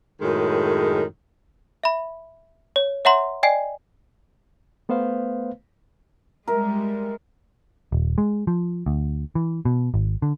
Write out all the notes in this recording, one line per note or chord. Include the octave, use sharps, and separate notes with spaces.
F#2 A2 D#3 G#3
E5 B5
C#5
C#5 E5 F#5 A#5 C6
D5 D#5 G5 G#5 C7
A3 B3 B4 C5 F5
G3 G#3 A#4 E5
D#1
G#3
F3
D2
E3
B2
G#1
D3